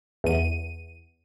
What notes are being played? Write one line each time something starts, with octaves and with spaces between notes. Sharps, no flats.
E2 D#7